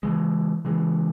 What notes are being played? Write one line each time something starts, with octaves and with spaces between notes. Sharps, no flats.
C#3 E3 G#3
C#3 E3 G#3